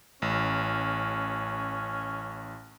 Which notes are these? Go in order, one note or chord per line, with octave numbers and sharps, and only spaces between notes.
A1 C#4